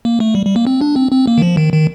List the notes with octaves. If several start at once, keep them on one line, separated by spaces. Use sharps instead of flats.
A#3
A3
G3
G3
A#3
C4
D4
C4
C4
A#3
D#3
F3
D#3
D#3